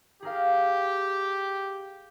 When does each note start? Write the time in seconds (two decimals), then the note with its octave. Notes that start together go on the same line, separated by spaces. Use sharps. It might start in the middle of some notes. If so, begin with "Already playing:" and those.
0.23 G4 G#4 A#4 F5